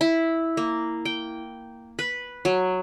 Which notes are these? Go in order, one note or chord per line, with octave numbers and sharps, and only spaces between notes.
E4
A#3
G5
B4
F#3